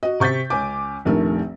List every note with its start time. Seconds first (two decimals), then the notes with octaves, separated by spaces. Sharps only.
0.03 F#4 D#5
0.20 C3 C#6 G6 A6 B6
0.50 C#2 C#4 G#5 D6
1.05 F1 A#1 D#3 A3 A#4